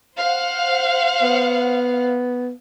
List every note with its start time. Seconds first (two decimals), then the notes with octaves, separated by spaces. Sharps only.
0.17 C5 F5 F#5
1.22 B3